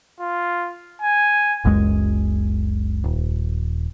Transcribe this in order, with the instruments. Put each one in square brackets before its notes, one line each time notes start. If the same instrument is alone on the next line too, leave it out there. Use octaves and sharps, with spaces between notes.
[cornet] F4
G#5
[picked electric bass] F#1 C#2 F#2 G#3
D#1